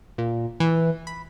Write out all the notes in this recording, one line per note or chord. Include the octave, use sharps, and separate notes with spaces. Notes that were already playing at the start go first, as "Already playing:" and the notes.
A#2
E3
B5